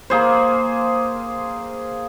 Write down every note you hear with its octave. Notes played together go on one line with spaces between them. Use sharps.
A#3 G#4 C5